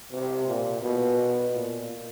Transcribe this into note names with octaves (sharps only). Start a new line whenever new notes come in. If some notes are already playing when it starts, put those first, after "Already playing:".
C3
A#2
B2
A#2